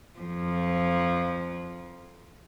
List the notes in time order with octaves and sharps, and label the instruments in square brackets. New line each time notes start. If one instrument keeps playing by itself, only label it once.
[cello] F2 F3